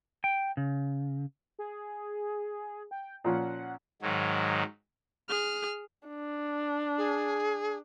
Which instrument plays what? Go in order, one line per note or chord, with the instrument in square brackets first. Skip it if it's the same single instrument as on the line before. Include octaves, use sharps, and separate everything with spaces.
[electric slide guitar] G5
C#3
[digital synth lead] G#4
G5
[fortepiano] A#2 F3 C#4 [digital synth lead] F#5
[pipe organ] G#2 D#3 F#3
[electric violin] G#4 F6
[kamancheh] D4
[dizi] G#4